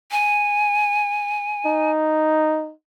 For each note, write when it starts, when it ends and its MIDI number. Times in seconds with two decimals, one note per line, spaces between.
0.11 1.91 80
1.66 2.73 63